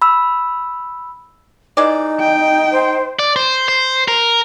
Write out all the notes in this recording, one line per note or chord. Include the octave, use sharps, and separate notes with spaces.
B5 E6
E3 G#3 D#4 D5
G5
C5
D5
C5
C5
A#4